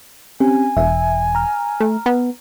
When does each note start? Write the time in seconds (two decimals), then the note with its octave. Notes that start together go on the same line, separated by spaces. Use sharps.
0.40 C4 C#4 G4 G#5
0.77 E1 E5
1.35 A#5 F6
1.80 A3
2.06 B3